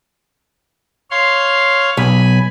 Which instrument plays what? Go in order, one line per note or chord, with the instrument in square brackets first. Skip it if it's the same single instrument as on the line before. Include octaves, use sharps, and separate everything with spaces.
[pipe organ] C#5 F5 C6
[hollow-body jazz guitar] B1 [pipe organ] G#5 B5